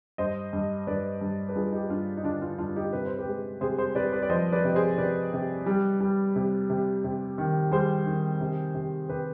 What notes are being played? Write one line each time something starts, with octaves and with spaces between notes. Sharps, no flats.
G2 C5 D#5
G2
G2 B4 D5
G2
B4
G2 F4 G#4
D#4 G4
G2 D4 F4
D#4
D3 D4 F4
D4 F4
G2 D4 F4
D#4 G4
C3 B4
C5
G4 B4
G#3
C3 G#4 C5
G#4 C5
C3 B4 D5
B4 D5
D5
F3 C5 D#5
B4 D5
C3
G#4 C5
C3 B4 D5
C3
G3
G3
C3
C3
C3
D#3
G3 G#4 C5
D#3
C3
C3
C3 G4 B4